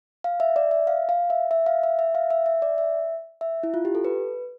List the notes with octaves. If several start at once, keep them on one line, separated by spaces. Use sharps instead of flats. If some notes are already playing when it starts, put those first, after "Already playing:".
F5
E5
D5
E5
F5
F5
E5
E5
F5
E5
E5
F5
E5
E5
D5
E5
E5
E4
F4
G4
A4
B4